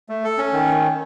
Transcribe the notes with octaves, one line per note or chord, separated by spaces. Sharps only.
A3
A4
C#4
D#3